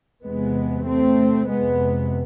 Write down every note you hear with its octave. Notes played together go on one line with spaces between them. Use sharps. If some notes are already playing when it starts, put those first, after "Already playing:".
E2 C3 G#3 B3
A3 C4
F2 C3 G#3 B3